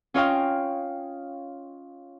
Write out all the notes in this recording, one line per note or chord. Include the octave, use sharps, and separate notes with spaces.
C#4 F4 C#5 D#5 F5 G5